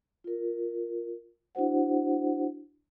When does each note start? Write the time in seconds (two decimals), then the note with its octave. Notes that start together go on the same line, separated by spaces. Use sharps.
0.24 F4 A#4
1.55 D4 E4 F#4 C5 F#5